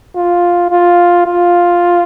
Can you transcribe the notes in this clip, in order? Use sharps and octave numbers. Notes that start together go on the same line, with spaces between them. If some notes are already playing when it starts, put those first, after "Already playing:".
F4
F4
F4